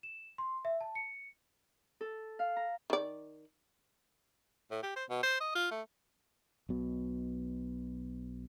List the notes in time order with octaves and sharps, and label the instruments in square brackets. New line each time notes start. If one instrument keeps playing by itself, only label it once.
[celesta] E7
C6
E5
A5
C#7
[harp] A4
F5
A#5
[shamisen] D#3 D5
[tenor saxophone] A2
G4
C5
B2
C5
D#5
F4
A3
[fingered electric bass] B1 B2